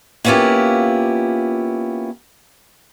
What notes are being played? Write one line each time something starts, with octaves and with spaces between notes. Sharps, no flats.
A#3 B3 C#4 E4 F4 G4